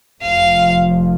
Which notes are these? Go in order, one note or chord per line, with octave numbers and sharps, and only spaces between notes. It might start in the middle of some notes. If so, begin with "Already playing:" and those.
F1 F2 F3 F5